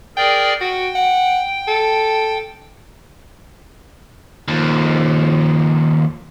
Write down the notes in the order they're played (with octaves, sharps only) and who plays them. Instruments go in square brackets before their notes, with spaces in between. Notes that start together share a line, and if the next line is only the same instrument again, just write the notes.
[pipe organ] G#4 A#4 D5 [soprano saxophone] G5
[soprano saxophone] F#4 [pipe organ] G5
[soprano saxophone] F#5
A4
[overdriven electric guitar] D#2 F3